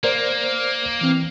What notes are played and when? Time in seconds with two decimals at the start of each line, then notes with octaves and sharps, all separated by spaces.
0.04 A#3 A#4 C5 D5
1.01 E3 C4